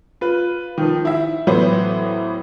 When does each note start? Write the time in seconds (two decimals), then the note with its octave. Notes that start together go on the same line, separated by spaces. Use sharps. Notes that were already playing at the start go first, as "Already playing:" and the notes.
0.21 F4 B4
0.78 D#3 F3
1.05 E4 E5
1.47 A2 E3 F#3 B3 C5